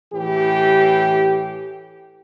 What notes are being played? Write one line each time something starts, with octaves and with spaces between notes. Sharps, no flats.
A2 E3 G4